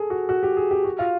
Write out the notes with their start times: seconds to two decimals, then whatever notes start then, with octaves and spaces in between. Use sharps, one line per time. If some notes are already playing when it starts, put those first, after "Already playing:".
Already playing: G#4 A4
0.10 F#4
0.29 F#4
0.43 G4
0.57 G#4
0.71 G4
0.85 F#4
0.99 F4